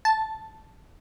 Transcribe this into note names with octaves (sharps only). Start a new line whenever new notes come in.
A5